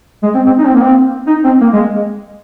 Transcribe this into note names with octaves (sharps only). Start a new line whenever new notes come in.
G#3
C4
C4
D#4
C4
A#3
C4
D#4
C4
A#3
G#3